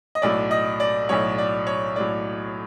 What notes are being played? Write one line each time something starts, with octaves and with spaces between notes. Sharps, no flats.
D#5
B1 A2 F#3 D5
D#5
D5
B1 A2 F#3 C#5
D5
C#5
A2 F#3 D5